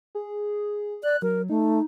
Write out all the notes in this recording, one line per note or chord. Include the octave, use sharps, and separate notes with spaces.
G#4
D5 F#6
F#3 A#4
A3 D#4